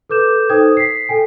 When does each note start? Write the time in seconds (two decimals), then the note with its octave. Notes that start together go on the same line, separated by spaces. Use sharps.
0.10 A4 B4 D6 G6 E7
0.49 D#4 A4 C5 G5 D#6 G#6
0.77 B6 C7
1.09 A4 G5 G#5